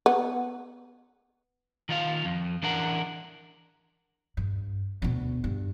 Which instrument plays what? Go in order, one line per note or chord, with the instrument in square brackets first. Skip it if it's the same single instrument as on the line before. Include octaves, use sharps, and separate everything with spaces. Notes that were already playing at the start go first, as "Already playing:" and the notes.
[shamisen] B3
[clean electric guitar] D#3 F4 F5
F2
E3 D4 A#4 F#5
[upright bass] G2
D2 B2
G2